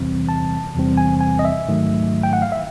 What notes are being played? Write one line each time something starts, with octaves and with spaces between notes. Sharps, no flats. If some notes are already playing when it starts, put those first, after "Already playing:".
Already playing: E2 C3 E3 G3 C4
A5
E2 C3 E3 G3 C4
G#5
G#5
D#5
E5
G#2 D#3 F#3 A3
G5
F#5
F5
E5